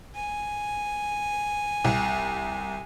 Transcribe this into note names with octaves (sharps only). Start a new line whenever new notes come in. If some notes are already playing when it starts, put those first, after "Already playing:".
G#5
C2